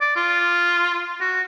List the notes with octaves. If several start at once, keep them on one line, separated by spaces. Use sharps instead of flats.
D5
F4
F#4